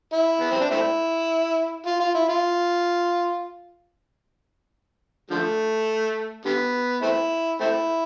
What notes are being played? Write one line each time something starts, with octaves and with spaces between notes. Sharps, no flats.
E4
B3
C4
D4
A3 C4 E4
F4
F4
E4
F4
D3 F3 A3
D3 G3 B3
A3 C4 E4
A3 C4 E4